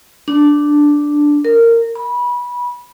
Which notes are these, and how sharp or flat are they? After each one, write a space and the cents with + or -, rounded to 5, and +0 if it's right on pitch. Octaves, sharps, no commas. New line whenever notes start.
D4 +0
A#4 -15
B5 -20